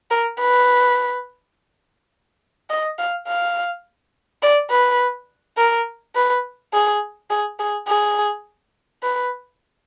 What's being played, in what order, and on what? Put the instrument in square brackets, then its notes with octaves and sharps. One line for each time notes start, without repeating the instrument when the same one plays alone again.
[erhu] A#4
B4
D#5
F5
F5
D5
B4
A#4
B4
G#4
G#4
G#4
G#4
B4